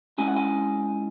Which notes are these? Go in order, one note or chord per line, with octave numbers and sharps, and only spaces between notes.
G#2 G#3 C#4 E4 G#5
F#5
G#5